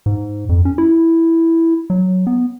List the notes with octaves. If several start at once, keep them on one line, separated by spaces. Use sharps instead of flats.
G#2
F2
C#4
E4
F#3
B3